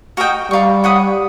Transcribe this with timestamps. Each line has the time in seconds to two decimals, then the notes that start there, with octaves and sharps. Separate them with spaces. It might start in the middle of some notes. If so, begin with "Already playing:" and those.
0.17 F#4 A#4 D#5 G5
0.51 G3 D5 F5 A#5 C#6
0.84 C#5 F#5 B5 D#6